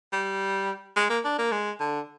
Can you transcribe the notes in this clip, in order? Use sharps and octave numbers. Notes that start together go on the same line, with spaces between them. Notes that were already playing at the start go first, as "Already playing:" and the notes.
G3
G#3
A#3
D4
A#3
G#3
D3